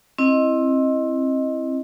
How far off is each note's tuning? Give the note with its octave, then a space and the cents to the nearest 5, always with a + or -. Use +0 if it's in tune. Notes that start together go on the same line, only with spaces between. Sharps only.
C4 +25 E4 +0 D#5 +0